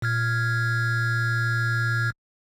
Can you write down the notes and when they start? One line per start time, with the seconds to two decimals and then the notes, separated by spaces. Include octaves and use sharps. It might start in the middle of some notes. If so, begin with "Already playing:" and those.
0.02 A#2 F6 G#6